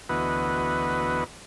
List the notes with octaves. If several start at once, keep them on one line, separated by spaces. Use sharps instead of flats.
D2 E3 B3 F#4 B4 D#5